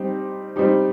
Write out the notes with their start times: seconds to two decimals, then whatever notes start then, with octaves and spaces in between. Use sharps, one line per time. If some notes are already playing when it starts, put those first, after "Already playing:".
Already playing: G3 C4 D#4 G4
0.56 G3 C4 D#4 G4